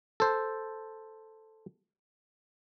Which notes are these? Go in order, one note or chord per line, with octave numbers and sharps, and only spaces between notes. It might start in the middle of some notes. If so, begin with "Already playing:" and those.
A4 C5